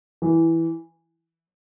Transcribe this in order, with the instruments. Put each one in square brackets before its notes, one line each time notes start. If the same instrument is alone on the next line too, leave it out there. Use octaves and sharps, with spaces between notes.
[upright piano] E3